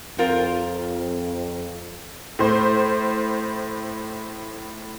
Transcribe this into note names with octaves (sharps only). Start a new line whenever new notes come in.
F2 C4 F4 A#4
A2 C5